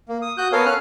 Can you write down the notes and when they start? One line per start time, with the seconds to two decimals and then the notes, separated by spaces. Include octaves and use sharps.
0.09 A#3
0.22 D#6
0.38 F#4 D#6 F#6 G6
0.52 B3 A4 A#4 C#5 F5 G#5
0.66 C#4 C#5 F6 F#6